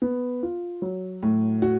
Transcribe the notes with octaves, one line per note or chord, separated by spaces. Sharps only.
B3
F4
F#3
A2
F#4